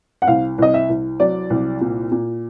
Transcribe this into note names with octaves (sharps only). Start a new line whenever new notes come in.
F#5
C2 F5
C2 D#5
E5
C2
F#3 D5
C2
A#2
A#2